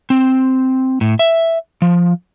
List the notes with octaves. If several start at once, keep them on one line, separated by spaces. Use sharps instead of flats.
C4
A2
E5
F3